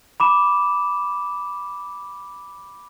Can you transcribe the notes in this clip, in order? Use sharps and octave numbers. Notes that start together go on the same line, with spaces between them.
B5 D6 E7